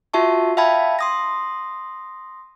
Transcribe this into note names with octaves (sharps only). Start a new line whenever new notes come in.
F4 F#4 E5 A5 C#6
E5 F5 G5 A5 B5 G#6
C6 D#6 A#6